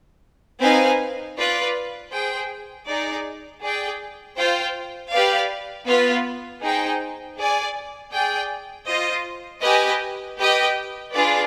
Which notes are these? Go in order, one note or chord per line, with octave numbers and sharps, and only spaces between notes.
C4 D#4 B4 F5 G#5
F4 B4 D5
G#4 C5 G5
D#4 G#4 D5
G#4 D5 G5
F4 C5 G5
G4 B4 D5 F5
B3 F4 B4
D#4 G#4 C5 G5
G#4 D5 G#5
G#4 D5 G5
F4 C5 D#5
G4 B4 D#5 G#5
G4 B4 D#5 G5
D4 F4 G#4 B4 D5